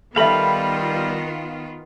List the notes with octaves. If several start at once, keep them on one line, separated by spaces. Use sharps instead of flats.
D#3 G3 B3 F4 A4 E5 F5 B5